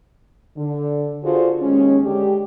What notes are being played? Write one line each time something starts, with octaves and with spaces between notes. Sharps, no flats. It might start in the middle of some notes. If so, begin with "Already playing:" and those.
D3
D3 F4 F#4 G#4 C5
D#2 G#3 C#4
D3 G#3 D4 G4